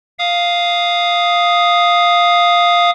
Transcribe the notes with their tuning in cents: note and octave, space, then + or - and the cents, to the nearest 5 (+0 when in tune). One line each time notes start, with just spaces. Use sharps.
F5 +0 D#6 +0